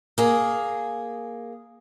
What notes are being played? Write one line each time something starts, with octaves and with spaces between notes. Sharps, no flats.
A#3 G#4